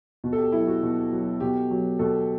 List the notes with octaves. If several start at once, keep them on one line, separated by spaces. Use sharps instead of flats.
B2
A4
G4
F#3 E4
F#4
B2
F#3
B2 G4
F#3
B2 A4